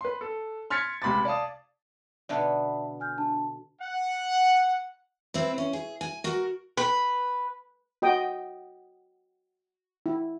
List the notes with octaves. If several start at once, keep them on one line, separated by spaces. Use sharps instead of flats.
B4 C6
A4
C6 F6 G#6 A6 B6 C#7
C#2 C3 B5 C6 D6 A6
D5 F5 A5 D#6
B2 D3 B3 D5 E5 A5
G#5 F6 G6
D4 A5
F#5
C4 E4 B4
C#4
G#4
G#5
F#4 A#4
B4
F#4 D#5 G5 D#6
E4